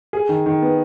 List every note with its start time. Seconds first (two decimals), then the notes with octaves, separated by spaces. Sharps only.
0.13 G#4
0.29 D#3
0.46 D#3
0.62 B3